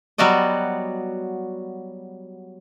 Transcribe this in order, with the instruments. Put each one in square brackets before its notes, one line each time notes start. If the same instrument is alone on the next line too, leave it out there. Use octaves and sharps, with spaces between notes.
[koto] F#3 G3 B3 F#4 D5 D#5